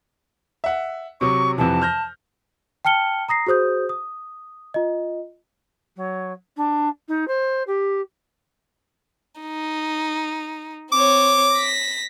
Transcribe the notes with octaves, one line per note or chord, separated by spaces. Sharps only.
E5 F#5
C3 F#3 C#6
F2 C3 E3 A5
F6 G6 A#6
G5 A5 F6 C#7 G7
A#5 D#6 A#6 C7
F#4 G#4 C5 D#6 G6
D#6
F4 D#5
F#3
D4
D#4
C5
G4
D#4
C4 C#5 D6
A#6 B6